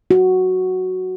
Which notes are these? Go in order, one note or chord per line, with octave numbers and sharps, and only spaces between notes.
F#4